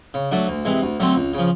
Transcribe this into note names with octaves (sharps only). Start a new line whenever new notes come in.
C#3
F#3 A3 D4 F#4
D2
C3 E3 G#3
D2
D3 F#3 A3 C4
C#2
C#3 F3